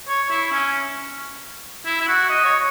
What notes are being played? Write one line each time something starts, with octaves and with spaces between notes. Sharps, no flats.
C#5
E4
C#4
E4
E4
F#4
D#5
C#5